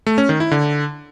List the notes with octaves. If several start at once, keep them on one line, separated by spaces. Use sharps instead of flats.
A3
C#4
D#3
E4
D3